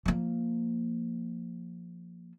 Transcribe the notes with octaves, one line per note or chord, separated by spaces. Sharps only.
F3 A#3